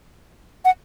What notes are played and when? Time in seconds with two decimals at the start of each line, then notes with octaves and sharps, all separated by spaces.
0.65 F#5